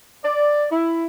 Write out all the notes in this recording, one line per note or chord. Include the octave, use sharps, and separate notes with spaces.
D5
E4